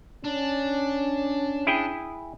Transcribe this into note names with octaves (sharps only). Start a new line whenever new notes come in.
C#4 D4
E4 G#4 G5